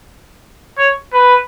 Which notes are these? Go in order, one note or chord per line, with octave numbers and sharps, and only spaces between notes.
C#5
B4